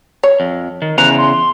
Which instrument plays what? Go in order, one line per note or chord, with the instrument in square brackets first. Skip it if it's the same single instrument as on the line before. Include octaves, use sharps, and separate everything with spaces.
[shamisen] C#5
[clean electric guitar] F2
D#3
[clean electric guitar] E2 C#3 A#5 [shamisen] C5 [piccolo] F#6
[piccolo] C6